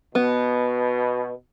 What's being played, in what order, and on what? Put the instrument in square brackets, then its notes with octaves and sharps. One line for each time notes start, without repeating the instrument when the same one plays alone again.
[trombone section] B2 [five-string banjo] B3